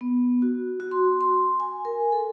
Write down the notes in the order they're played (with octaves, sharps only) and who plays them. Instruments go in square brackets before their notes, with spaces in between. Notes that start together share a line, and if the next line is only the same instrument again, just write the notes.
[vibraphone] B3
F#4
F#4
C6
C6
G#5
A#4
A4